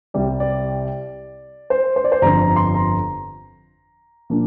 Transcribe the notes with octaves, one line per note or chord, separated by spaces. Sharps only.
C2 C3 G3 D5
D5
C5
C5
D5
C5
G1 F2 D3 F3 A#5
A#5
C6
A#5
A#2 F3 A#3 D4